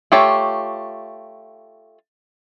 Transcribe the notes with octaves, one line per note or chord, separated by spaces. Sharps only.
A3 F4 G4 C#5 E5